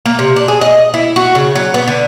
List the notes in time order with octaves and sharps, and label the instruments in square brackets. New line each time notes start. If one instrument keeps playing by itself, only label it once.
[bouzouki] A#3
C3
D4
G#4
D#5
E4
F#4
C#3
F#3
B3
D3